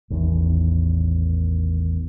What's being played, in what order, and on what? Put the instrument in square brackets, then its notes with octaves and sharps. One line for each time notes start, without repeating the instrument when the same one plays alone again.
[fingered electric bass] A1 E2 D#3